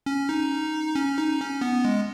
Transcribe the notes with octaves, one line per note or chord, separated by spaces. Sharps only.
C#4
D#4
C#4
D#4
C#4
B3
G#3